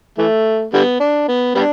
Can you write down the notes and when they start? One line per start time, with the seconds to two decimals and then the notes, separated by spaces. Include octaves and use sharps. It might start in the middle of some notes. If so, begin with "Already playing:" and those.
0.18 E3 A3
0.73 D3 G3 B3
1.00 D4
1.28 B3
1.55 G3 B3 D4